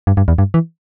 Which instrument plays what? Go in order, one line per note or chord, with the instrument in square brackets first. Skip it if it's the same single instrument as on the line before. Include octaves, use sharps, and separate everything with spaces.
[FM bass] G2
G2
E2
G2
E3